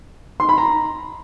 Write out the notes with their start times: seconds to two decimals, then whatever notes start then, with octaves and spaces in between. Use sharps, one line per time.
0.40 C6
0.49 B5
0.58 A#5